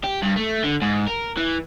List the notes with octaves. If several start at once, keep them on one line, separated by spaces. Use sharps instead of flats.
G4
G2
A3
D3
G#2
A#4
E3